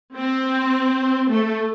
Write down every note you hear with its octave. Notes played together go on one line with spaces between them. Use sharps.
C4
A3